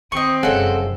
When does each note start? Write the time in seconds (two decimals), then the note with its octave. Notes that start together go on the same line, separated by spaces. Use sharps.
0.12 D#3 C4 D#4 C#6
0.43 F1 F#2 C#3 G#3 F#4 A4